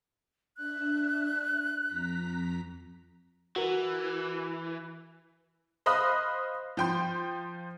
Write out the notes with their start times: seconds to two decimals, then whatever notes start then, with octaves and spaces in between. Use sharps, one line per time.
0.57 D4 E5 F#6
1.86 F2 A#5 B6
3.56 E3 F#4 A#4
5.86 C5 D#5 F5 B5 D#6 F#6
6.77 F3 G5 C6